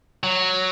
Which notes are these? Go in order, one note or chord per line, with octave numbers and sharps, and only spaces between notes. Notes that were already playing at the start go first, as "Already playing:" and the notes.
F#3